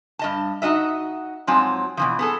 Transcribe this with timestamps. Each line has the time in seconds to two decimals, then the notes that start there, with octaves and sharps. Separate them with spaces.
0.19 G2 D#5 A5
0.62 D#4 F#4 D#5 E5
1.47 G#2 F3 F#3 C4 G#5 A5
1.97 B2 E3 F3
2.19 B3 G#4 A4